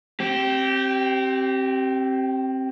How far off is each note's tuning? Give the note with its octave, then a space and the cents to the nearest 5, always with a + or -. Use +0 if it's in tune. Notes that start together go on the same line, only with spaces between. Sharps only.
C4 +20 G4 -20